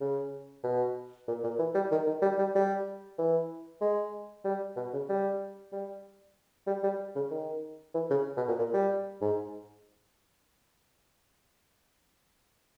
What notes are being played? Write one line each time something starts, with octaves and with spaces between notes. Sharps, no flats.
C#3
B2
A#2
A#2
E3
G3
D#3
D#3
G3
G3
G3
E3
G#3
G3
B2
C#3
G3
G3
G3
G3
C#3
D#3
E3
C#3
B2
A#2
A#2
G3
G#2